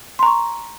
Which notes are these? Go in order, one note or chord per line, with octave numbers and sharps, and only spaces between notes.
A#5 C6 C#6